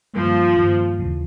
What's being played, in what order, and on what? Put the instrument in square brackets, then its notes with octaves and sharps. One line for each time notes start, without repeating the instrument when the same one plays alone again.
[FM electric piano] G2 D#3 G3 A#3 [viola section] F3
[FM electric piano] G2 D#3 G3 A#3
D#2 C#3 E3